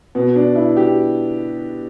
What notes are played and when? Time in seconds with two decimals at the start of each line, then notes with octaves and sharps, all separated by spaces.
0.15 B2 B3
0.36 D4
0.56 E4
0.77 G4